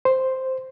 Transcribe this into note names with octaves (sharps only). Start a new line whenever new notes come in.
C5